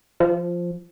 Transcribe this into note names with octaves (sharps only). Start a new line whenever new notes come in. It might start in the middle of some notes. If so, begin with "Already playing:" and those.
F3